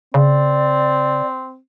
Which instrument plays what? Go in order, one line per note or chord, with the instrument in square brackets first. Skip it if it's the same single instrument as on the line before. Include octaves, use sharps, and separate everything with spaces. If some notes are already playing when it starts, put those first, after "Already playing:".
[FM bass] C#3 [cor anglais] C4 [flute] D5